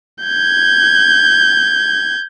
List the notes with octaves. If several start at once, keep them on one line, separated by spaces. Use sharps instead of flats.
G6 G#6